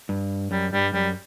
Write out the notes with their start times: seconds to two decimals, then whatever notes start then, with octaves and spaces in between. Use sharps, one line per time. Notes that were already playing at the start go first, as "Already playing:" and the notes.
0.09 G2
0.51 F#2 G3
0.73 G2 G3
0.94 F#2 G3